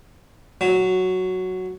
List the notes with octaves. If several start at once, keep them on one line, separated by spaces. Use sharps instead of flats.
F#3